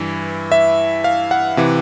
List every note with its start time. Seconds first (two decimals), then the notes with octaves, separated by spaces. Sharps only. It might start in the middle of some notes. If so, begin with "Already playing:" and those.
Already playing: G2 E3
0.52 E5
1.04 F5
1.31 F#5
1.57 C3 E3